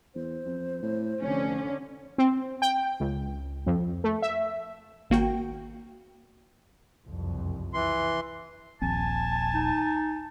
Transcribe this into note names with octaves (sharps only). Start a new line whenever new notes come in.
E2 C5
F2
A2
F1 D3 C#4
C4
G5
C#2
F2
A3
E5
G#1 A#3 F#4 G5
F#1 C2 F2
E3 C6
D#1 A#1 C4 G#5 A5
D#4